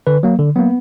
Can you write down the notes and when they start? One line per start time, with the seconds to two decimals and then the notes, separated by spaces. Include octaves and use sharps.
0.07 D3 B4
0.23 F#3 A#3
0.39 D3
0.56 F#3 A#3 B3